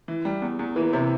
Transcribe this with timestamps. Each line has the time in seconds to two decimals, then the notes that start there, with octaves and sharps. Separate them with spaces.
0.08 E3
0.25 G3
0.42 E2
0.59 E2
0.76 E3 A#3
0.93 C3 E4